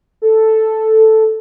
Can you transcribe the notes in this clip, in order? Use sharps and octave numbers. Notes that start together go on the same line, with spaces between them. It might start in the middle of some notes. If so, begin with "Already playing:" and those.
A4